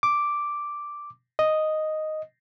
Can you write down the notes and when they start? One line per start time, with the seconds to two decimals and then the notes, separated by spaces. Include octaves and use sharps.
0.03 D6
1.39 D#5